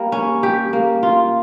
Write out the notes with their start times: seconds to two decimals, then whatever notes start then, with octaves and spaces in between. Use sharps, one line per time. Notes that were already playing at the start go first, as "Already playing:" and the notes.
Already playing: G3 A#3
0.12 C#4
0.43 G4
0.73 A#3
1.03 F4